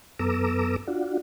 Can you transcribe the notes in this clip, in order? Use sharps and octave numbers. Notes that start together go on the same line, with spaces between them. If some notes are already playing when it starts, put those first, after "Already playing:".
F#2 B3 A4 A#5 D6 E6
D4 F4 F#4